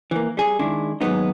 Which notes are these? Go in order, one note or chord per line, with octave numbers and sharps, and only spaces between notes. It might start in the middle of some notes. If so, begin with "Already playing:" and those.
E3 A#3
G3 G#4
D#3 G#3 D4 E4
D#2 G#2 F#3 G#3 B3 D#4